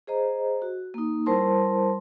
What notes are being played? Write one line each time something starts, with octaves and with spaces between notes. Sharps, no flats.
G#4 C5 D#5 A#5
F#4
A#3 D#4
G3 E4 A#4 C5 A5 C6